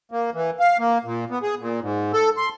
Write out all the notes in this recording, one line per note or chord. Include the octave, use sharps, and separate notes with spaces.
A#3
E3
F5
A#3
A#2
B3
G#4
A#2
G#2
A4
C6